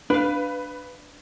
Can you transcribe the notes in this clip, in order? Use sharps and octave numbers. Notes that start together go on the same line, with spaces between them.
D4 B4 F5